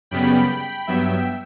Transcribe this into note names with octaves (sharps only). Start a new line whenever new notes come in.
F#2 C#3 G3 B3 G5 B5
G2 F#3 B3 E5 G5